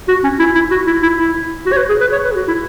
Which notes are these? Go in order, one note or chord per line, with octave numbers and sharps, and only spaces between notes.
F#4
C#4
E4
E4
F#4
E4
E4
E4
F#4
C#5
B4
G#4
B4
C#5
B4
G#4
F#4
E4